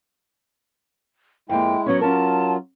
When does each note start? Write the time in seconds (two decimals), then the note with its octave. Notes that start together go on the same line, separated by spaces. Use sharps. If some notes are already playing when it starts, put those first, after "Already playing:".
1.49 F2 G#3 A#3 E4 G5
1.86 F#3 B3 C#4 C#5
2.01 F#3 C#4 F4 A#4 A5